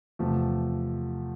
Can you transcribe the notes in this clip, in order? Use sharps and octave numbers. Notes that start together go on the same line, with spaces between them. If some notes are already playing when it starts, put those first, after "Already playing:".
E2 C3 F3 A3